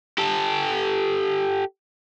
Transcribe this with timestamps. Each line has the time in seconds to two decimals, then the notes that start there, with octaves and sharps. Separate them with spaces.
0.18 G4 A4